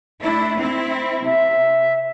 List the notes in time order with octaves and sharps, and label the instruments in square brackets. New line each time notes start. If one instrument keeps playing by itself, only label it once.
[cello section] A3 D4 E4
C4 E4
[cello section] C3 [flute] E5